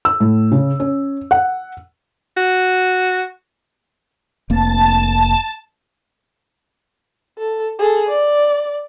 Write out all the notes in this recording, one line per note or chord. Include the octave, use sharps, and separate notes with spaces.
E6
A2
C#3
C#4
F#5
F#4
F1 A#3 A5
A4
G#4 A4
D5